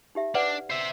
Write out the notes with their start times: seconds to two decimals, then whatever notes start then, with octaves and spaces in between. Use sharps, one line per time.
0.15 D#4 G4 E5
0.35 D4 B4 D5 F#5
0.70 C5 E5